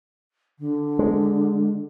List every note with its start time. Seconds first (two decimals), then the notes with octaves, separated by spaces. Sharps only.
0.59 D3
0.99 G#3